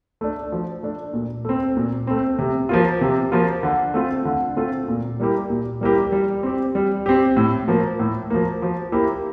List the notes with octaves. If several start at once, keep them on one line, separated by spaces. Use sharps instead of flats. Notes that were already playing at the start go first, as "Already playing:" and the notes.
A3 D4
F3
A3 D4
A#2
A3 C4
A#2
A3 C4
C3
F3 A#3 F4
C3
F3 A#3 F4
D3
A3 C4 F4
D3
A3 C4 F4
A#2
G3 A#3 E4 G4
A#2
G3 A#3 E4 G4
G3
C4 G4
G3
C4 G4
A2
F3 A#3
A2
F3 A#3
F3
A#3 E4 G4